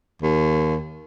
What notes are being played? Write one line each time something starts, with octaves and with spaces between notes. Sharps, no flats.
D#2